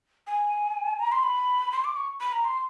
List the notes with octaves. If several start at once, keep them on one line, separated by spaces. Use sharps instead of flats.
G#5
A#5
C6
B5
C6
D6
C#6
B5
A#5
C6